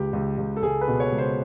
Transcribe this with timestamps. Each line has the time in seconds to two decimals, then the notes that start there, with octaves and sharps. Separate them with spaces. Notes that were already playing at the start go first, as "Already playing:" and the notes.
Already playing: C#2 G4
0.13 C#2
0.38 C#2
0.56 A4
0.62 C#2 G#4
0.81 B4
0.88 B2
1.00 C#5
1.12 C#2
1.18 C5